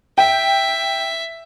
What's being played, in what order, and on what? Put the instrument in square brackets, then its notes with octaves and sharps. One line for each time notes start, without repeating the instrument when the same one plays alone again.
[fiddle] E5 [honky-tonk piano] G5